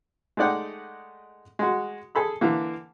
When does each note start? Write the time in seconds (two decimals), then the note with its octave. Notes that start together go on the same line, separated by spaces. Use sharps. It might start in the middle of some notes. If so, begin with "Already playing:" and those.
0.37 G#3 A3 D#4 D5 F#5 G5
1.59 G#3 F#4
2.15 G#4 A4 B5 E6
2.41 D3 E3 A#3